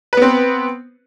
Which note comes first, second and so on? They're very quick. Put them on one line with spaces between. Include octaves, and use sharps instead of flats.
B4 B3 C4